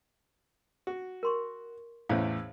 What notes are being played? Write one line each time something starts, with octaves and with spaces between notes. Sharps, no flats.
F#4
A#4 C6 C#6
A1 E2 A2 C5 C#5 F5